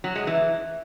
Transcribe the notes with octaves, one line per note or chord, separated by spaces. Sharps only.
F#3
G#3
E3